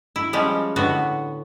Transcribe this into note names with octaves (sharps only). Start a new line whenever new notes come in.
E4
F3 G3 G#3 C#4
A2 D3 B3 F#4